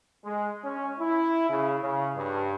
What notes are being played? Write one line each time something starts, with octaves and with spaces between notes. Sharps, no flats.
G#3
C#4
E4
C#3
C#3
G2